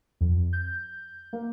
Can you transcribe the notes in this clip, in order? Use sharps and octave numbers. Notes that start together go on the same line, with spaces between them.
F2
G6
A#3